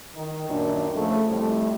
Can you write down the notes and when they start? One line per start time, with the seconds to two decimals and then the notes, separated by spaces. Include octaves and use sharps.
0.16 D#3
0.49 F#2 A#2 D#3 D4
0.95 C#3 F3 A3
1.29 F2 A2 G3 A3